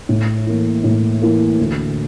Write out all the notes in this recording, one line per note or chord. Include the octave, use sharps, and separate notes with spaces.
A2
E3 A#3
A2
E3 A#3
D2